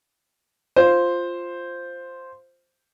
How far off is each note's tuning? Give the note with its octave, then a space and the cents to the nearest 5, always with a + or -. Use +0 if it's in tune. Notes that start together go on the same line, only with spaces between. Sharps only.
F4 +0 C5 +0